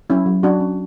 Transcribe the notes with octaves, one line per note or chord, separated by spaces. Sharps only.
F#3 C#4 E4
F#3
F#3 D4 F#4
C#4